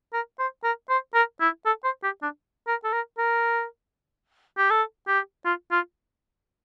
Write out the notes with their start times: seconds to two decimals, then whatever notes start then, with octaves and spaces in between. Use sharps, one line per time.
0.13 A#4
0.39 C5
0.64 A#4
0.89 C5
1.14 A#4
1.41 E4
1.66 A4
1.84 C5
2.03 G4
2.22 D4
2.67 A#4
2.84 A4
2.92 A#4
3.18 A#4
4.58 G4
4.70 A4
5.08 G4
5.45 F4
5.72 F4